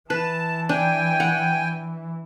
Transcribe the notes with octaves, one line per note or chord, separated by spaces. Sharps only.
E3 B4 A5
D4 G5 G#5
F#5